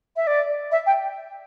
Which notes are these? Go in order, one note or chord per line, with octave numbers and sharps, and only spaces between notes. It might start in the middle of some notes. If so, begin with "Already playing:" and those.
E5
D5
E5
G5